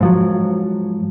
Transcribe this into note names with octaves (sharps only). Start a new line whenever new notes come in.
G#2 F3 F#3